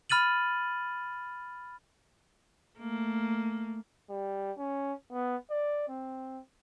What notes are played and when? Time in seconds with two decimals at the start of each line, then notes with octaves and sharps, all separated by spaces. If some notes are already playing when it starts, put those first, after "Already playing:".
0.10 B5 F6 A6 D#7 F#7
2.78 A3 A#3
4.10 G3
4.58 C#4
5.12 B3
5.51 D5
5.88 C4